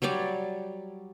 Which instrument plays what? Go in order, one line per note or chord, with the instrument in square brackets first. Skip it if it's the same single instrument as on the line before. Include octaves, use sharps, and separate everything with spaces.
[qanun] F#3 G3 C#5 D5